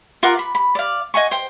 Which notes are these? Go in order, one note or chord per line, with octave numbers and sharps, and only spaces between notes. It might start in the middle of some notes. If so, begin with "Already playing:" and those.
F4 A#4 F#5 D6
B5
B5
D5 F5
D#5 F#5 G#5 C#6
C5 G5